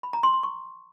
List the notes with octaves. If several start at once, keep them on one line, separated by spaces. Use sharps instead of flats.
B5
A#5
C6
C6
C#6